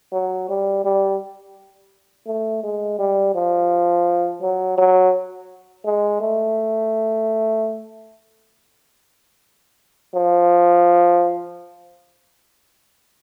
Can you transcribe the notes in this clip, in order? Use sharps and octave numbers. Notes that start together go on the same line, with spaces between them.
F#3
G3
G3
A3
G#3
G3
F3
F#3
F#3
G#3
A3
F3